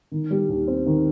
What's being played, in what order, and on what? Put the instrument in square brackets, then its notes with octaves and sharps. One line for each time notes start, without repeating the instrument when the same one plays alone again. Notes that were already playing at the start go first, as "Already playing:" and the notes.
[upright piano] D#3
G3
D#2
C4
D#3